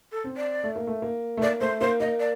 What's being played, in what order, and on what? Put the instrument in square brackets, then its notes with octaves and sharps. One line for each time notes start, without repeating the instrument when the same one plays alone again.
[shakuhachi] A4
[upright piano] C4
[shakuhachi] D5
[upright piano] A3
A#3
A3
A#3
A3
[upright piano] A#3 [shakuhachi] D5
[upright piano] A3 [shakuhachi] C5
[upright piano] A#3 [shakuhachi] C5
[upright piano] A#3 [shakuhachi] D#5
[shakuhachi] D5